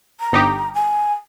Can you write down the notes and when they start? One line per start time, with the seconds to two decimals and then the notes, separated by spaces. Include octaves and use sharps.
0.20 A#5
0.32 G1 D#4 G4
0.75 G#5